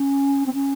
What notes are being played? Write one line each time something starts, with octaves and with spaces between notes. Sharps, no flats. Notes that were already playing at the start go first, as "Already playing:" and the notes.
Already playing: C#4
C4
C#4